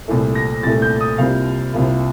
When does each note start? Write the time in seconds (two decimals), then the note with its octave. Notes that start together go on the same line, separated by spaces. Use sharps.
0.08 C2 A#2 A3
0.35 A#6
0.63 C2 A#2 A3 A6
0.82 G6
1.01 D#6
1.18 C2 C3 G3 A#3 F4 F5
1.74 C2 C3 G3 A#3 F4